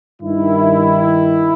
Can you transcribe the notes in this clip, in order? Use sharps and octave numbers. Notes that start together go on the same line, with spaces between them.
G2 D#3 E4